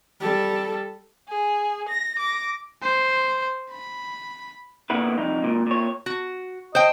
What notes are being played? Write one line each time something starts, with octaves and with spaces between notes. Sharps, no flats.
G3 A4
G#4
A#6
D6 A#6
C5
B5
A#2 D3 B3 E4 B4
C2 F2 D#4
C#2 A#2
A#2 C#5
F#4
C5 D#5 G5